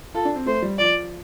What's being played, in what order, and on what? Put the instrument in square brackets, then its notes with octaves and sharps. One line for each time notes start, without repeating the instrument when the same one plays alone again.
[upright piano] F4 [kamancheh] A4
[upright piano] D4
C4
[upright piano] A3 [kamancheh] C5
[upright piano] G3
[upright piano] F3 [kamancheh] D5